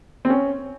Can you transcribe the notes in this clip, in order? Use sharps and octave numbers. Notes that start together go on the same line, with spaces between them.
C4
C#4